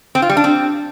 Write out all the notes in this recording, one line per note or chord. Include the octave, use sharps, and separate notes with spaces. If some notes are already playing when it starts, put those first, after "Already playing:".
C4
F4
G3
D4
C4